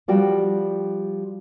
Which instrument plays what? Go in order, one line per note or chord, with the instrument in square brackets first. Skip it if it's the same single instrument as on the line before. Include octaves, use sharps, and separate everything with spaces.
[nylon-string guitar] F3 G3 F#4 G5